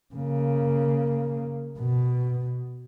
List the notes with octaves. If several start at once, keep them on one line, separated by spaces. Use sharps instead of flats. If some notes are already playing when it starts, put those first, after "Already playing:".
C#3 A#3
B2